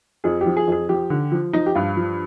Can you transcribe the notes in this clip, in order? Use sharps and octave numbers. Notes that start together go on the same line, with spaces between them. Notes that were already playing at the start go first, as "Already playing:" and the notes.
F2 G#4
G4
F3
G#4
F2 G#4
F3 G4
D3
F3
F3 D#4
G4
G2 F4
F3